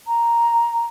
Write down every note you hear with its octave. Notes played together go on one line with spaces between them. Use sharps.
A#5